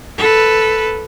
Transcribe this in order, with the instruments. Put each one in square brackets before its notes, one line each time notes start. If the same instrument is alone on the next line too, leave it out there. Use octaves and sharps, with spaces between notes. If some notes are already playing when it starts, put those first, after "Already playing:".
[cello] A4 B4